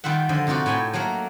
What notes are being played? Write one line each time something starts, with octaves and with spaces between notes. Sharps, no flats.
D#3 G3 F4 E5 F#5
D3 F3 D#5
C3 D#4 F4 F#4 D5
A2 C#5 G5 G#5 B5
F#3 A3 A#3 A#4